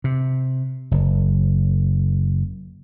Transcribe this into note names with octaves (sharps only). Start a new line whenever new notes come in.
C3
F#1